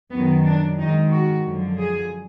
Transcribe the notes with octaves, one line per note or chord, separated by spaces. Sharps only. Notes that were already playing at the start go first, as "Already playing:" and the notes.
F#2 D#3 B3
D4
G#2 D#3 D#4
F#4
F#2 D3 F3
G#4